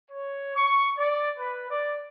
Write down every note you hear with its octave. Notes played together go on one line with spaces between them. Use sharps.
C#5
C#6
D5
B4
D5